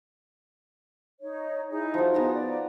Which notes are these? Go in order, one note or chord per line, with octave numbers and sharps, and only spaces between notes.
D#4 C#5
D#4 E4 G#4
F3 F#4
B3 D#4 F4 G#4 A#5
D5